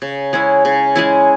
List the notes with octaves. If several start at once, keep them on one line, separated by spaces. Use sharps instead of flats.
C#3
G#3 C#4 E4
C#3
G#3 C#4 E4